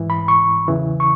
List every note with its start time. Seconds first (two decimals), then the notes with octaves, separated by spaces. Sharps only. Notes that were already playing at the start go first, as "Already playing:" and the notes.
Already playing: G#2 E3
0.10 B5
0.28 C#6
0.68 E2 C#3 E3
1.00 C#6